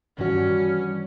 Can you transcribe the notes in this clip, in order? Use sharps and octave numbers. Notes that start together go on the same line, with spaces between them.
G2 D#3 E3 G3 C#4 F#4